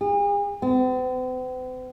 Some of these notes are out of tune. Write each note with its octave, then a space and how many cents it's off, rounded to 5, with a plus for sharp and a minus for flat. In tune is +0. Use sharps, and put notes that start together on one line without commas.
G#4 -45
C4 -45